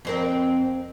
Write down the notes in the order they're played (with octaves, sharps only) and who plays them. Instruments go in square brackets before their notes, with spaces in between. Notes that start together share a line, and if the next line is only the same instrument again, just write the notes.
[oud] F2 C4 A#4